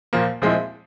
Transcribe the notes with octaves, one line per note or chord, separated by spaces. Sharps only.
A#2 F3 A#3
A#2 F3 G#3 C4 E4